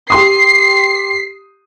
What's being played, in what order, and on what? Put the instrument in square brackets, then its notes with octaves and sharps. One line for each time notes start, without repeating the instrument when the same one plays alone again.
[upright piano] G4 C6 D#6 [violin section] C7